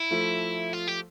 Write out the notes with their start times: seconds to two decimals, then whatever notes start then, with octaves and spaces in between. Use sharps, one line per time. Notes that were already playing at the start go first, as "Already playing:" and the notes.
Already playing: E4
0.11 F3 A3
0.73 F4
0.87 G4